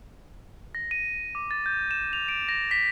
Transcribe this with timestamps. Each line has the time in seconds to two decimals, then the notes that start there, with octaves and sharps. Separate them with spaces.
0.75 A#6
0.91 D#7
1.35 D6
1.51 A6
1.66 G6
1.91 E7
2.13 F7
2.29 D7
2.49 A#6
2.71 B6